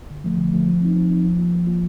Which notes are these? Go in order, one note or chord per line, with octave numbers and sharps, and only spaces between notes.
D3
F3 A3
D3
F3 A3
F3
C4 D#4
F3
C4 D#4
F3
A#3 F4
F3
A#3 F4